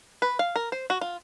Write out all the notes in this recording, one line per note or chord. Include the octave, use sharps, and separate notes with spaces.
B4
F5
A#4
C5
F#4
F4